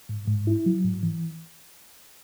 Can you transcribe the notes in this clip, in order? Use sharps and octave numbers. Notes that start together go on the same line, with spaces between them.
G#2
G#2
E4
F#3
G#2
E3